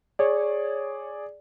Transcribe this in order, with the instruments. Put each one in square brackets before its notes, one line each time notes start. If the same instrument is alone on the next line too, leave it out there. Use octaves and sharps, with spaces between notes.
[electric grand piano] G#4 D5 [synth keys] C#5